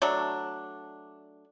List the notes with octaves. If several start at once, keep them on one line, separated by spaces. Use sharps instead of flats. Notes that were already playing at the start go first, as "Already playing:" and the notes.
F#3 A3 D4